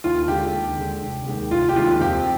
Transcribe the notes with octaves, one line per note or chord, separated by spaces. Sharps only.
D#2 F4
D3 G#3 G4
D#2
D3 G#3
F1
D#2 D#3 G#3
F1 F4
G4
D#2 D#3 G#3 F4
F2 G4